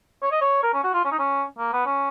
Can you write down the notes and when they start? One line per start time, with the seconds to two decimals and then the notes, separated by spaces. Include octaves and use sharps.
0.22 C#5
0.32 D#5
0.41 C#5
0.63 A#4
0.74 C#4
0.84 F#4
0.93 F4
1.05 C#4
1.12 D#4
1.19 C#4
1.58 A#3
1.73 B3
1.86 C#4